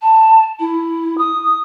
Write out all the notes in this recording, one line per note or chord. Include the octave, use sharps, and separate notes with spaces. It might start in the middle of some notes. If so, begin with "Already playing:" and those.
A5
E4
D#6